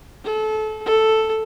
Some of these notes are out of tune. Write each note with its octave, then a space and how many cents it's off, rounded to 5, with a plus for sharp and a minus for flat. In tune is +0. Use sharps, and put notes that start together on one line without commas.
A4 -25
A4 +0